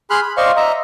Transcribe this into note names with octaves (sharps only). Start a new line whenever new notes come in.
G#4 B5 C6 F6 F#6
B5
C5 D5 D#5 F5 C6 C#6
D#5 E5 A#5